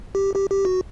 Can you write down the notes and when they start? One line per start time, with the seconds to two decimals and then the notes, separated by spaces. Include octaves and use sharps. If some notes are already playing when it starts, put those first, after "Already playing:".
0.15 G4
0.36 G4
0.50 G4
0.65 F#4